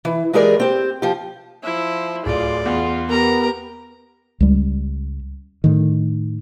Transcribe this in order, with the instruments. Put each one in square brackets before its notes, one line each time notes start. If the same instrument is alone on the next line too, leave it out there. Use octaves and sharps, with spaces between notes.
[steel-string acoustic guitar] E3
E3 G#3 G4 G#4 A#4 D5
C4 G4
F3 G4
[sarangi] F3 [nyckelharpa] E4
[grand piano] D1 [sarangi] F4 [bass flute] G#4 [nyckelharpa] D5
[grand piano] E2 [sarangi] F4
[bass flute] B3 [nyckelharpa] G4 A#5 [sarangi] A#4
[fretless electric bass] C#2 G3
A2 D#3